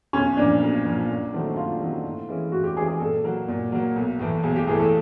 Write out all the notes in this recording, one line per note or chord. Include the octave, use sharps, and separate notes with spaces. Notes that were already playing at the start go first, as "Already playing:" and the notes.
B1 C#4
A#2 F3 D4
B1
A#2 F3
F#2
D#3 F#3 A3 C4
F#2 F4
D#3 F#3 A3 C4
A2
E3 G#3 C#4 E4
A2 F#4
G4
E3 G#3 C#4 E4 G#4
G#4
A#2 A4
F#3 A#3
A#2
F#3 A#3
B1
A2 E3 A3
B1 G#4
G4
A2 E3 A3 G#4
A4